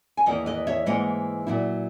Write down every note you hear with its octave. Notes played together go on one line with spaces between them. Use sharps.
G#5
E2 D#3 A#3 E4 D#5 F#5
B4 D#5
C#5 E5
G#2 E3 A#3 E4 D#5 F#5
A#2 F#3 B3 E4